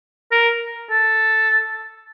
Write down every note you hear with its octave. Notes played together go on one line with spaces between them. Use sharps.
A#4
A4